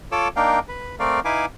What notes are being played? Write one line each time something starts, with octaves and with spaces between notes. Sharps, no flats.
F4 A4 C#5 D6 E6
A#3 D4 D#4 A#4 F5 G5
B4
A3 C4 A#4 D5 F5
D#4 E4 B4 F5 G#5 D6